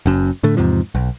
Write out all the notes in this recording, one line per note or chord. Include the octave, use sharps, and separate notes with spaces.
F#1 F#2
A2 D3 A3
E2 G#2 C3 F3
B1